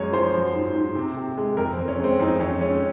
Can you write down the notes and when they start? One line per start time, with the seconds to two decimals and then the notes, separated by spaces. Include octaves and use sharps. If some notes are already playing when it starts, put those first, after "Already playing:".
Already playing: F#2 G#3 C#5
0.13 F3 C5
0.34 F#3
0.54 G#2
0.75 G#2
0.95 C3
1.17 C3
1.38 G#3
1.57 F2 A#4
1.74 C4
1.78 F2
1.88 C#4
1.99 G#3 C4
2.20 F2 D#4
2.39 F2 C#4
2.61 G#3 C#4